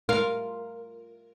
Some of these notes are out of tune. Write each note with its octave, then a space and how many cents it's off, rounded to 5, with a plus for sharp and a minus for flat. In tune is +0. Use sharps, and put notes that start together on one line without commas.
F4 +0 A#4 -5